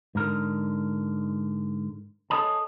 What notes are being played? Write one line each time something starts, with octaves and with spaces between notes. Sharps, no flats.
G#2 D3 A#4
A4 C5 C#5 D#5 G#5 A5